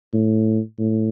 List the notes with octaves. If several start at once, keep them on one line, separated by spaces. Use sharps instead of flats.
A2
A2